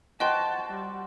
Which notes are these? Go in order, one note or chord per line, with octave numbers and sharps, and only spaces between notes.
F#4 C5 D#5 G5 A5 C6
G3